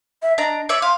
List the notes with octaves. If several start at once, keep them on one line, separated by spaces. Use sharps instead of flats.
E5
D4 D#5 A#5
C#5 D5 E5 D6
F5 C6